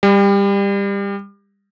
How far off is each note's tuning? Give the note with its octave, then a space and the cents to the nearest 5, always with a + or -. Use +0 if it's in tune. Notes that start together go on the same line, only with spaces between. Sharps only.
G3 +25